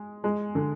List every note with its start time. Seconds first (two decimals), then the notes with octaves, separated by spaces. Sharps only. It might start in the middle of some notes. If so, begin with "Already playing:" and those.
Already playing: G#3
0.24 G#3
0.55 D3